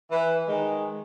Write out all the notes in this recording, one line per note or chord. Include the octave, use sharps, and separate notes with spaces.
E3
D#3 G#3